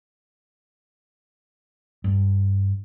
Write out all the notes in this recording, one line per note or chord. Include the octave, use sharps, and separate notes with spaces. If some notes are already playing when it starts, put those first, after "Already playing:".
G2